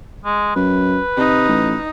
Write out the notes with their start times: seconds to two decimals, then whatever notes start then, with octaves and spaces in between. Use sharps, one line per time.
0.25 G#3
0.56 F#2 B4
1.17 C3 D#4
1.49 A1